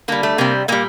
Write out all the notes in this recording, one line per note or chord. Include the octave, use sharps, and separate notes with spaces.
D3 G3 A#3
A3
C3 G3 A#3
A#2 G3 A#3